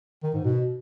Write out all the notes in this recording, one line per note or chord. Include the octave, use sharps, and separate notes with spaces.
D#3
G#2
B2